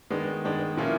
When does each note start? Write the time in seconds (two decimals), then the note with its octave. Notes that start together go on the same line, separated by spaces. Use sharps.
0.10 D#3 G#3 B3 D4
0.45 D#3 G#3 B3 D4
0.77 A#2 F3 A#3 C#4 E4